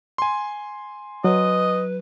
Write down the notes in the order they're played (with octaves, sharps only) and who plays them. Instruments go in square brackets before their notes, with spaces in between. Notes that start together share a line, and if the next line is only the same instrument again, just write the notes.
[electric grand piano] G#5 C6
[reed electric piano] F#3 [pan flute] B4 [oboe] D#5